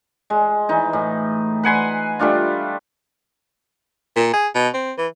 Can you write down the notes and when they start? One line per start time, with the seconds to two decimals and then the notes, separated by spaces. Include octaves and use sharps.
0.30 G#3
0.69 E3 D#4
0.93 A2
1.63 B4 F#5 G#5 C6
2.19 G3 A3 D4 F4
4.16 A#2
4.33 G#4
4.55 B2
4.74 C4
4.98 E3